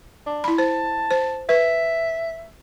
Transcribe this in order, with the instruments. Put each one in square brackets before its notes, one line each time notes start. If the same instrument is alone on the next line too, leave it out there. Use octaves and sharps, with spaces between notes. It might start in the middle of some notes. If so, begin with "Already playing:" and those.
[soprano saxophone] D4
[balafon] E4 B5
[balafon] C5 [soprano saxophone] A5
[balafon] C5
[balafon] B4 [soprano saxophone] E5